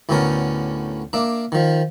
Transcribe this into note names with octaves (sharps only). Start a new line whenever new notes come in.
D2 A2 D3 B3 C#4 A#4
A#3 D4 E5
D#3 F3